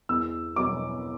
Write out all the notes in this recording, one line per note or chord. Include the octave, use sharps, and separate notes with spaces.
E2 E6
B2 F#3 D6